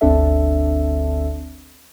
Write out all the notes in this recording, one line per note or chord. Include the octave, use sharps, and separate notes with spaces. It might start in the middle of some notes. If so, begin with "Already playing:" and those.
G1 D2 C4 D4 A4 E5